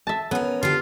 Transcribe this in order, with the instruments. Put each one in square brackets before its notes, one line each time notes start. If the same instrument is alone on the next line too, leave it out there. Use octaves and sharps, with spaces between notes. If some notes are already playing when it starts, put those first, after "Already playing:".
[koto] E5 A5
[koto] B3 [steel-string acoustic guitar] C#4 A#4
[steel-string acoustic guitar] D3 G4 [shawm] F4 [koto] F5